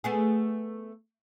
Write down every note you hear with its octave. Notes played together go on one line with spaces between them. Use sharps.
A3 B3 G#4